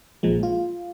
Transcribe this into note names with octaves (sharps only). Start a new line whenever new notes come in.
A#1 A#2 F3 G#3
F4